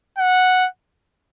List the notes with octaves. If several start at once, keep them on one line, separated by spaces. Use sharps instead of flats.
F#5